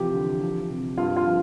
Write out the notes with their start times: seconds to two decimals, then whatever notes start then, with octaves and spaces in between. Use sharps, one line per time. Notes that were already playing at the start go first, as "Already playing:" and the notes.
Already playing: C3 E3 F3 G4
0.14 D3
0.42 F3
0.70 C3
0.98 G2 F4
1.17 F4
1.27 F3